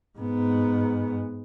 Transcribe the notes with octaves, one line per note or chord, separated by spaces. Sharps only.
G#2 B3